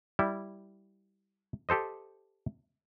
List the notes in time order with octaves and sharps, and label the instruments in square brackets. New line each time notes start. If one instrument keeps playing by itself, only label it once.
[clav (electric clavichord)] G3 E4
G4 A4 C5 D#5